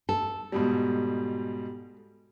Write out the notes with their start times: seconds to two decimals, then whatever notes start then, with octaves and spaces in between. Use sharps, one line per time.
0.09 A4
0.52 G#2 B2 G3